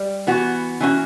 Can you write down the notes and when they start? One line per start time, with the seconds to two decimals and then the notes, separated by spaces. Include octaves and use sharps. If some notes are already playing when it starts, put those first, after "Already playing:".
Already playing: G3
0.27 E3 B3 F#4
0.80 E3 A#3 C#4 F#4